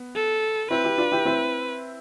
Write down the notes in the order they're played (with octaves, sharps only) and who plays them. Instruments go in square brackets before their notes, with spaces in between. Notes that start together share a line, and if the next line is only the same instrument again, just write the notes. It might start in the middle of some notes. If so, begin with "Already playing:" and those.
Already playing: [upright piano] B3
[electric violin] A4
[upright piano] C4 E4 [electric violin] B4
[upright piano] E4 G4
D4 F4
E4 G4
C4 E4